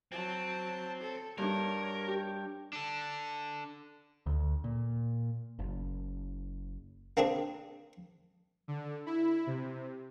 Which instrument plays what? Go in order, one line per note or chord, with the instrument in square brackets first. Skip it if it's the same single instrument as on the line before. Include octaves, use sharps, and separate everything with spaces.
[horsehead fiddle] F#3 A5 [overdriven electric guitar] C4
[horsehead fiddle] A4
[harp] G2 D4 [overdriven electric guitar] A#4 [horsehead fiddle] C#5
[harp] G4
[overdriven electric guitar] D4 A4
[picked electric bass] D2
A#2
F#1
[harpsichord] A#3 C4 D4 G#4
[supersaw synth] D3
E4
C3